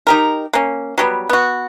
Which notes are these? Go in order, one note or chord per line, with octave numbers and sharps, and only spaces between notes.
D#4 G4 A#4
A#3 C#4
F#3 G3 B3
B3 F#4